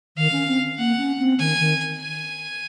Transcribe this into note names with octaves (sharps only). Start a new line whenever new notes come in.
D#3 F5
C#4
C4
A#3 F#5
C#4
C4
D#3 G#5
D#3
G#5